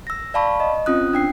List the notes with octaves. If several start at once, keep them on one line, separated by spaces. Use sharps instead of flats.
E6 A#6
D5 F5 A5 B5 C#6
D#5
C4 C#4 F4 D#6 F#6
D4 G5 C7